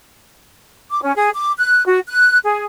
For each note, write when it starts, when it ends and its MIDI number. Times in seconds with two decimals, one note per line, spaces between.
0.90 0.99 86
1.03 1.14 61
1.16 1.30 68
1.34 1.52 86
1.58 1.84 90
1.85 2.00 66
2.07 2.38 90
2.44 2.66 68